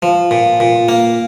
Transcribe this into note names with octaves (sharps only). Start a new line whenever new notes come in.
F3
A#2
A#2
A#3